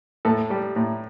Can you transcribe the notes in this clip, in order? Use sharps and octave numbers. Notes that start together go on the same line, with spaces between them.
A2 A4
G3
A2